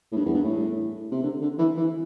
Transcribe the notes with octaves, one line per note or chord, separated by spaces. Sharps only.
A2
G2
E2
G2
A2
C3
D3
D3
E3
E3